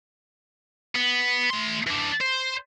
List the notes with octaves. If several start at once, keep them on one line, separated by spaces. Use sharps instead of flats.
B3
A3 C6
E3 D4
C5